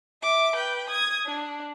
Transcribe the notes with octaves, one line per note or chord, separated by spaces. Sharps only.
E5 D6
B4 G5
D#6 G#6
D4